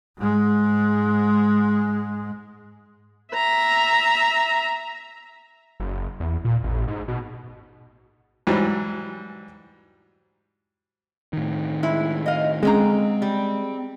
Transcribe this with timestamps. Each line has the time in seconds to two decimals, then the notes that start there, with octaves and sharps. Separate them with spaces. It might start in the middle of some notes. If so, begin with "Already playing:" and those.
0.18 G#2 G#3
3.34 E5 A#5
5.80 F#1
6.20 E2
6.45 A#2
6.64 A1
6.88 G#2
7.08 B2
8.47 G#2 E3 F#3 G3
11.33 A2 D#3
11.83 G#3 E4
12.26 D#5 F5
12.63 D3 G#3 C4 C#4 A#5
13.22 G3